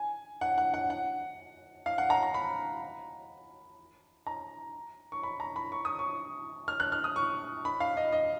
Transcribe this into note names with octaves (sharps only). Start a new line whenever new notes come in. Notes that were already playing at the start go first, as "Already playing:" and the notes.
Already playing: G#5
F#5
F#5
F#5
F#5
F5
F#5
A#5
A#5
B5
A#5
C#6
B5
A#5
B5
C#6
D#6
C#6
F6
F#6
F6
D#6
C#6
B5
F5
D#5
D#5